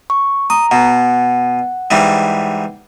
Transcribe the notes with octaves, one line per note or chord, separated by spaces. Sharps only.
C#6
A#5 D#6
B2 F#5
G#2 E3 G3